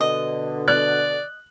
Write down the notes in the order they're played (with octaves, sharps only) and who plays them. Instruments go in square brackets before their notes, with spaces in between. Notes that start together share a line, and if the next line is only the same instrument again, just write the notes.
[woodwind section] B2 D3 [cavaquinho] D#5
[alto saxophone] D5 [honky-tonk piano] F#6